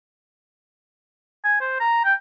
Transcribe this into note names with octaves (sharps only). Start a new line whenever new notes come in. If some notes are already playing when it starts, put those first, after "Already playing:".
G#5
C5
A#5
G5